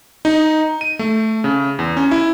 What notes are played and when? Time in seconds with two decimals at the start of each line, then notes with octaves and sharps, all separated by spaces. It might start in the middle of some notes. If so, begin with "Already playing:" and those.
0.25 D#4
0.81 D#7
0.99 A3
1.44 C#3
1.79 E2
1.97 C#4
2.11 E4